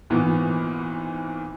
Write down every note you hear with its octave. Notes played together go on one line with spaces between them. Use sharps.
G#1 A#2 E3 B3